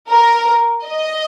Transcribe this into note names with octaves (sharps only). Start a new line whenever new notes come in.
A#4
D#5